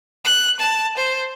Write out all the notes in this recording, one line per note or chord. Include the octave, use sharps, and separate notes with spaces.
F#6
A5
C5